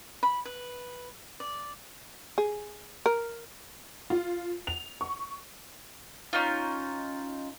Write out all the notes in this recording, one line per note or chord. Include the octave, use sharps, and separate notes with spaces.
B5
B4
D5
G#4
A#4
F4
F7
C#6
C#4 D#4 F4